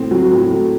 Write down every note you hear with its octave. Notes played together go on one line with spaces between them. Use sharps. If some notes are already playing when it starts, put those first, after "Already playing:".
Already playing: A2 C4
F#3
A2
A3